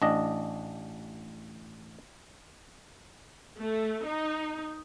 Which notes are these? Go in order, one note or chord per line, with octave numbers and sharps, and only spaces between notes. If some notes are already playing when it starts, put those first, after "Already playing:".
A1 D4 D#5
A3
D#4